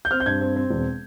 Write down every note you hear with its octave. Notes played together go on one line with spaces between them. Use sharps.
G6
C4 F6
G6
G2 G#6
C4
C4
E1